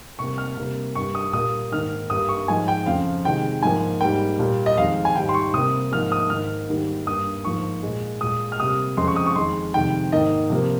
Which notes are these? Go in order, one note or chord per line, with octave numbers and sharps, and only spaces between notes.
C3 G3 A#3 C#6
F6
C3 G3 A#3
G2 G3 A#3 C#6
D#6
A#2 G3 A#3 D#6
G#2 D#3 A#3 F6
G2 G3 A#3 D#6
C#6
G#2 F3 G#3 G#5
G5
F2 C#3 F3 F5
C3 D#3 G#3 G5
G#2 F3 A#3 G#5
G#2 G3 A#3 G5
A#2 G3 A#3
D#5
F2 D#3 G#3 F5
G#5
G#2 D#3 G3 G5
C6
C#6
C3 G3 A#3 D#6
G#2 F3 A#3 F6
D#6
G#2 D#3 A#3 F6
G#2 D#3 G3 A#3
G2 G3 A#3 D#6
G#2 F3 A#3 C#6
A#2 G#3
A#2 G#3 D#6
F6
C3 G3 A#3 D#6
F2 C#3 G#3 C6
C#6
D#6
C#6
F2 D#3 G#3 C6
F2 C3 D#3 G#3 G5
G#2 D#3 A#3 D#5
C3 F3 A#3